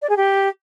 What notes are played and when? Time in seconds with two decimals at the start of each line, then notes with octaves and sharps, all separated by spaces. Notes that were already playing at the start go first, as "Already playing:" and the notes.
0.01 D5
0.09 G#4
0.16 G4